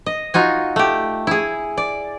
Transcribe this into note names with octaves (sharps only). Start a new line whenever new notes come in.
D#5
D#4 F4 F#4 G#5
A3 G4
E4 G#4
D5